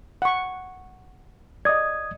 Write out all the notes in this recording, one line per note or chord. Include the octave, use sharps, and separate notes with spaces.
F#5 C#6
D5 D#5 D#6 G#6